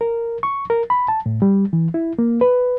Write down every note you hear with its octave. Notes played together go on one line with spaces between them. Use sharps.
A#4
C#6
A#4
B5
A5
A2
G3
E3
E4
A#3
B4